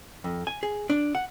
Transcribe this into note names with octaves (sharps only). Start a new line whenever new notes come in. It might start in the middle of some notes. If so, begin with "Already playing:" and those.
F2
G#5
G#4
D4
F#5